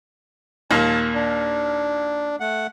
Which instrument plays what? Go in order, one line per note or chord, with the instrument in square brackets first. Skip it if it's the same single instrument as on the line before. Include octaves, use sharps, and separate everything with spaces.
[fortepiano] D#2 A#2 A#3 [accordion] A5
[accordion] D4
A3 F#5